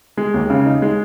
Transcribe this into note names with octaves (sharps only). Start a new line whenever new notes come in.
G#3
D#2
C#3
D#4
G#3